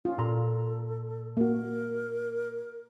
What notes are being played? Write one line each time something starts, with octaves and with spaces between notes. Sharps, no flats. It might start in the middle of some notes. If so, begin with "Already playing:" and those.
C#4 F4
A#2 A4 A#5 C6
A#3 F#4 A#4